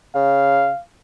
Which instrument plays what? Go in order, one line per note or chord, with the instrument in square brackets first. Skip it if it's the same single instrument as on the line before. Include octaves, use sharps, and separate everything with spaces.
[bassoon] C#3 [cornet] F5